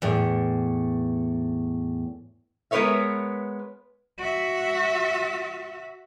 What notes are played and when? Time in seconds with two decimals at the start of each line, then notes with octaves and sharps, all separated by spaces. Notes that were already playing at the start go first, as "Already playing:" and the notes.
0.02 E2 A2
2.71 G#3 B3 A#4 B4 C#5 E5
4.18 F#4 E5